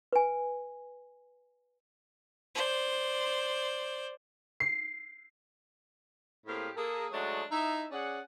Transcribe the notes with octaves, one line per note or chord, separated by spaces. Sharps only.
B4 G#5
C5 D5
C7
A2 A#3 C4 G4 G#4 F5
A#3 G#4 A4
F#3 G#3 A3 D4 D#4 F#4
D#4 E4 E5
C#4 G#4 D5 F#5